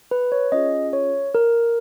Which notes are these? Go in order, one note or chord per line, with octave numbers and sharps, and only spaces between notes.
B4
C#5
C#4 F4 G#4 D#5
C#5
A#4